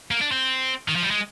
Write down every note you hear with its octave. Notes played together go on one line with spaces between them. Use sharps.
A#3
D4
C4
D#3
F3
G3
G#3